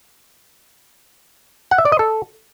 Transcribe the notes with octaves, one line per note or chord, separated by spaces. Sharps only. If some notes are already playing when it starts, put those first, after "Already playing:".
F#5
E5
D5
D#5
A4